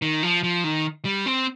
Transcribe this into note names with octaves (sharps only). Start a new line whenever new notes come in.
D#3
F3
F3
D#3
G3
C4